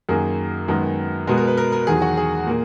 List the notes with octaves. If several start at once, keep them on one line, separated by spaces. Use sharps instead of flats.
F#2 D#3 A#3 G#4
F#2 D#3 G#3 B3
B2 G#3 B3 A#4
A#4
B4
A#4
A#4
E2 D#3 F#3 G#4
F#4
G#4
A#2 A#3